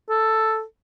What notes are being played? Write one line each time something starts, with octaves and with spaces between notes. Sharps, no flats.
A4